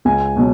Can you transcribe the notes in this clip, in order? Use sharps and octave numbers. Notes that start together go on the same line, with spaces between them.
C#2 G#5
B2 F#3